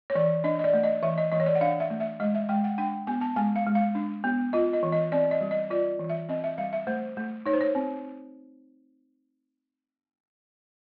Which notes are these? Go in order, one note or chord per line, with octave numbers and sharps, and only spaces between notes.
C#5
E3 D5
D4 D#5
D#5
D5
A3
D#5
E3 E5
D#5
E3 D#5
C#5
D5
F#5
D4 F5
E5
A3
E5
G#3 D#5
E5
G#3 G5
F#5
D4 G5
B3 G#5
A5
G#3 G#5
F5
G#3
F5
D4
B3
F4 D#5
D#5
E3
D#5
C4 D5
D#5
G3
D#5
F4 D5
E3
E5
C4 D#5
E5
G3 F5
E5
A3 C5
A3
D#4 C#5
C5
C#5
C4